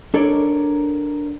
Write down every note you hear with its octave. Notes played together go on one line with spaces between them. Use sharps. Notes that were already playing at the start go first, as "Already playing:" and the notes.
D4 A4 A#4 C#5 D5